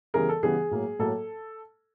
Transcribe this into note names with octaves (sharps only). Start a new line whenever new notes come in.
C#3 E3 G3 B3 G#4 A#4
A4
C#3 E3 G3 B3 G#4
A2 F#3 A#3
A2 F#3 A#3 A4